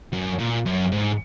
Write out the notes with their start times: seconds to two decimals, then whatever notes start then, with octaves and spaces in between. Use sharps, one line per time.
0.13 F#2
0.39 A#2
0.66 F#2
0.92 G#2